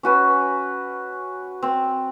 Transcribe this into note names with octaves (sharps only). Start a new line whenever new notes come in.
C#4 F#4 B4
C4